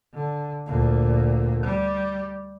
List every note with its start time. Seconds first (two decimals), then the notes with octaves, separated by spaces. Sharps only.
0.14 D3
0.67 D2 A#2
1.63 G3